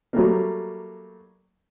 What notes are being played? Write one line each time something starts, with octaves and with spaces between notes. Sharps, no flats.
F#3 G3 A3 A#3